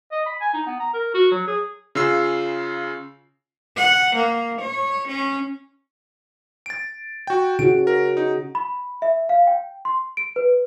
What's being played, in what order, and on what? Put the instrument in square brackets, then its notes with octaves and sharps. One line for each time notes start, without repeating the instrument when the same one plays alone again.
[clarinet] D#5
B5
G#5
D#4
B3
A#5
A#4
F#4
F#3
G#4
[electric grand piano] C#3 F4 E6 C7
[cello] F#5
A#3
C#5
C#4
[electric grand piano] A6 D7
F#4 G5
[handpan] C#3 F#4 [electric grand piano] D7
[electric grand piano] A#4
D#4
[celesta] B5
E5
F5
G5
C6
D7
B4